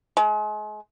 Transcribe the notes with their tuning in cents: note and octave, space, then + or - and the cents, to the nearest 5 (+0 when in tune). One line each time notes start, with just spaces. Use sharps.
G#3 +35